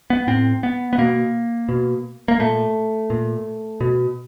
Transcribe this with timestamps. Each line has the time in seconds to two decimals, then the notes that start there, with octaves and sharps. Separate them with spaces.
0.10 B3
0.27 A2 C4
0.63 B3
0.93 B3
0.98 B2 A#3
1.69 B2
2.28 A#3
2.39 A#2 A3
3.10 A#2
3.81 B2